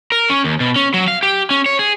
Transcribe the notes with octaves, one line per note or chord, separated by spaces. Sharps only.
A#4
C#4
D#2
B2
C#4
F#3
F5
G4
C#4
C#5
G#4